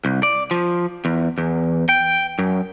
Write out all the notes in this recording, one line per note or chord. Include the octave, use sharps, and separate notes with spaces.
C2
D5
F3
E2
E2
G5
F#2